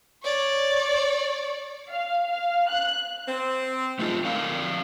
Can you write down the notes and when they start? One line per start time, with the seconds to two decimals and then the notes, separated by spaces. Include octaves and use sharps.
0.23 C#5 D5
1.89 F5
2.28 F5
2.70 F#6
3.27 C4
3.99 D3 E3 G#3 A3 D#4 F4
4.25 A3 C4 A#4 D5 F5